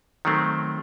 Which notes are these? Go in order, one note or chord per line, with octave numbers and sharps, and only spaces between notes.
D#3 F#3 A3 C4